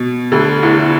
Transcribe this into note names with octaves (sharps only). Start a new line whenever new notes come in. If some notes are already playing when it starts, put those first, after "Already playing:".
Already playing: B2
D2 D3
E2 E3
E3